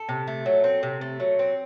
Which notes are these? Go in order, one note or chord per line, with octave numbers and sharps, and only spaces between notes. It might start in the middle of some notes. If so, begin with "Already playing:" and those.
Already playing: A4
C3
A3
F#3
C4
C3
A3
F#3
C4